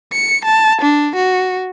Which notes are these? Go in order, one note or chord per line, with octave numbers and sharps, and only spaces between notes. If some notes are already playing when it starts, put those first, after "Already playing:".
C#7
A5
D4
F#4